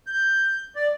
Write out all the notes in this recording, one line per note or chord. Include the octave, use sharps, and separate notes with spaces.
G6
D5